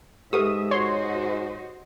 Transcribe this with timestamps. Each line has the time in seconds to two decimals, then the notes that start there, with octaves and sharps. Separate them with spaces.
0.33 G#2 G#3 G4 A4 B4 E5 D#6
0.71 F#4 C5 C#5 D#5 C6